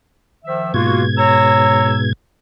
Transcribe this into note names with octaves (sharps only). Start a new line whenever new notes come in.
D#3 F3 E5
G#2 B2 A#3 F4 F#4 G#6
C#5 A#5 E6